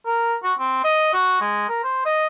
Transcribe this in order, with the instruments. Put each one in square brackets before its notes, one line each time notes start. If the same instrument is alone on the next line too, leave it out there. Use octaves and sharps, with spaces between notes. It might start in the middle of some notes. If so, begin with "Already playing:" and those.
[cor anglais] A#4
F#4
C4
D#5
F#4
G#3
A#4
C5
D#5